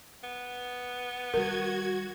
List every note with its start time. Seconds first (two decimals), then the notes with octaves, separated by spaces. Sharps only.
0.24 B3
1.34 D#3 G3 F#4 A#4 G#6